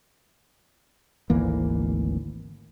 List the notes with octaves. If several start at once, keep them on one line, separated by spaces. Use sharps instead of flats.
G#1 D2 E3 A#3